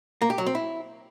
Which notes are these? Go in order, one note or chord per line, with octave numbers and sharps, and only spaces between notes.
A#3
G4
F#3
C4
E4